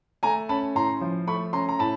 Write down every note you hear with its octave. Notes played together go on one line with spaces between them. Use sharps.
A3 G#5 A#5
C#4 A5 B5
A2 A#5 C6
F3
A3 B5 C#6
C#4 A#5 C6
A#5
A2 A5 B5